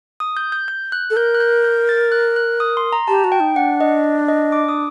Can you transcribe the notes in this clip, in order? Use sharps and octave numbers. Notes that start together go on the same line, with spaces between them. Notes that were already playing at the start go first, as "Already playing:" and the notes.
D#6
G6
G6
G6
F#6
A4
A#4 G6
F#6
G6
G6
A6
F#6
F#6
D#6
C6
A#5
G4 A5
F#4
G5
D#4
D4 F#5
D#5
D#5
D6
D#6